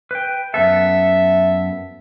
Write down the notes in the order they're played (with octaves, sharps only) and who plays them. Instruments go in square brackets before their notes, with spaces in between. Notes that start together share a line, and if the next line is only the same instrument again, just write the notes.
[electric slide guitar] B4 G5
[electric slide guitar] F#2 B3 A4 [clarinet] E5